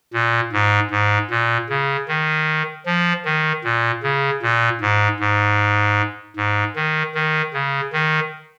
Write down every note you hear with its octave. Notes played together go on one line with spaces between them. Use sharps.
A#2
G#2
G#2
A#2
C#3
D#3
F3
D#3
A#2
C#3
A#2
G#2
G#2
G#2
D#3
D#3
C#3
D#3